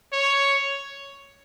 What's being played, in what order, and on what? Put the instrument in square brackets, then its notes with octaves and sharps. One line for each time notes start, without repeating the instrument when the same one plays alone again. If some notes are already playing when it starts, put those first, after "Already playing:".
[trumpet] C#5